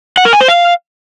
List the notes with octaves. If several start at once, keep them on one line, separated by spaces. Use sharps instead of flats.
F#5
A#4
G#5
C5
F5